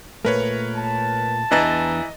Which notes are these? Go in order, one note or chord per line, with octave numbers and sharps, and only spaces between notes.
A#2 A3 A#4 B4 C#5
A5
E2 E3 B3 D4 D#5 A#5 A6